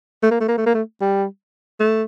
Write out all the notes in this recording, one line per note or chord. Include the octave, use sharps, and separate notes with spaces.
A3
A#3
A3
A#3
A3
A#3
A3
G3
A3